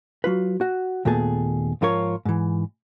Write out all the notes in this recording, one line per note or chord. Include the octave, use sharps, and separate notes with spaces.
F#3 F4 B4
F#4
D#2 A#2 A3 B3 G#4 A5
G#2 F3 F4 A#4 C#5
G#2 E3